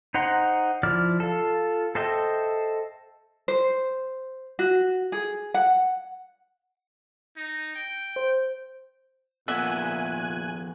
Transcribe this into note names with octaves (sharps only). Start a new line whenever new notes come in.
D#4 C5 F#5 A#5 C6
F3 E4 D5 D6 F6
F4 A4
A4 C5 D#5 E5 G5
C5
F#4
G#4
F#5
D#4
G5
C5
F2 A#2 B3 E5 F#5 G#5 F#6